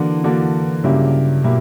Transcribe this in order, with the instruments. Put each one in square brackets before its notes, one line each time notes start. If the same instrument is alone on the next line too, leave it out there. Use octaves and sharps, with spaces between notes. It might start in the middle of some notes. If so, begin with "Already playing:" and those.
Already playing: [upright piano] D3 A#3 D4 F#4 [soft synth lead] E3
[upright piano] D3 A#3 D4 F#4
[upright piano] G2 F#3 A#3 E4 G4 [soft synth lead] C#3
[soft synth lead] B2 [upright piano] F#3 A#3 E4 G4